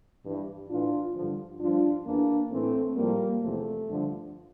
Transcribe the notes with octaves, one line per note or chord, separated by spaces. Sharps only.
G2 E3
A2 E3 D4 F4
G2 D3 F3
G2 F3 D4 F4
E2 E3 A#3 D4
A2 E3 A3 C4
A2 F3 G3 A#3
E2 C3 F3 A3
G2 D3 F3